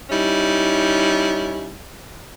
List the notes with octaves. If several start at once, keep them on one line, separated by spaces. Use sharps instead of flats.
G3 C#4 D#4 E4